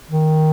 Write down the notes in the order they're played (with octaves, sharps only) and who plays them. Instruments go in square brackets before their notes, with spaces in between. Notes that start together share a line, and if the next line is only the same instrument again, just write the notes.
[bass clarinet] D#3